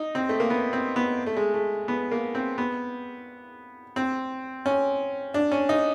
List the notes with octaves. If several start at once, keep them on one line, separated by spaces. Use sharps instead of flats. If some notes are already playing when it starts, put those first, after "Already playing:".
Already playing: D#4
C4
A3
A#3
B3
C4
B3
A3
G#3
A3
B3
A#3
C4
B3
C4
C#4
D4
C#4
D#4